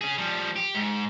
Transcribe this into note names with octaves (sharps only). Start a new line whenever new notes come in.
C#4 G#4
F3 G3
G4
G#2